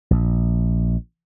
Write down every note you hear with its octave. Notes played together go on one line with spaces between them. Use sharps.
A#1